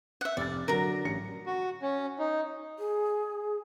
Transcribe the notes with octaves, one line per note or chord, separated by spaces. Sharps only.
E5 F#5
F1 D5 F6 A6
D3 F#3 A#4 A#5
A1 C#7
F#4
C#4
D#4
G#4